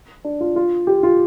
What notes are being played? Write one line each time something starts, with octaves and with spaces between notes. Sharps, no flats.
D4
F4
F4
G4
F4